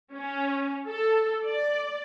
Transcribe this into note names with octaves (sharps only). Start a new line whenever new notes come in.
C#4
A4
D5